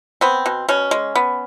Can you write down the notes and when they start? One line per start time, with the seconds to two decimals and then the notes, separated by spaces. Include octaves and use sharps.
0.21 B3 C4
0.46 B2
0.69 B2 C#4
0.91 G#3
1.15 B3